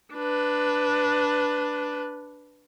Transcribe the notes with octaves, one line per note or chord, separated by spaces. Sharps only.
D4 B4